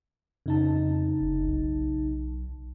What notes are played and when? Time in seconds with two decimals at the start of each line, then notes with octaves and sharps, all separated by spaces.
0.46 F2 C#3 D#4 A5
1.21 F1
1.45 B1